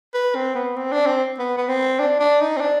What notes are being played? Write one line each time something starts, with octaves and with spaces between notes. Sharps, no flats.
B4
C4
B3
C4
D4
C4
B3
B3
C4
D4
D4
D#4
C4
D4